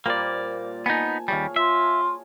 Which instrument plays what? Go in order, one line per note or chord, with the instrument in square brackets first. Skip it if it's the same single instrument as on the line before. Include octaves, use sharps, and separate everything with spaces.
[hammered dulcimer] A#2 G3 C5 [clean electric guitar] A#3 D5
[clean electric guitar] B3 D#4 [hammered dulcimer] G#5 A5
[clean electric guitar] D#2 G3 [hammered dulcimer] G#4 C#5 F5
[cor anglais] F4 [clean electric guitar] E5